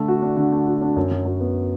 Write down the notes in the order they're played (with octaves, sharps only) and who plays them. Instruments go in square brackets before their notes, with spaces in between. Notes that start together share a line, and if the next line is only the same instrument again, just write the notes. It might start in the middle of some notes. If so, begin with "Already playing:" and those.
Already playing: [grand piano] D3 A3
F#4
D4
D3
A3
F#4
D4
F#2
F#3
F#2
B3